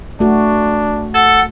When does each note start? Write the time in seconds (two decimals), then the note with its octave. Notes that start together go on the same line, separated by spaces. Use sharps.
0.20 A3 D4 F#4
1.14 A4 F#5